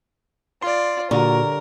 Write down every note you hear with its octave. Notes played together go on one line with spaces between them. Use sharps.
F4 D5 C6
A#2 D3 G3 F#4 A#4 C#5